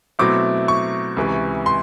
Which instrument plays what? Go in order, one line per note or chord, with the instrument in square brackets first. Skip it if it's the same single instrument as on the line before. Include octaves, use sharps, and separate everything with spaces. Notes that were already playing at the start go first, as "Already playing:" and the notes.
[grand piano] B2 F#3 A3 C4 E4 D6
C#6
C#2 C3 E3
C6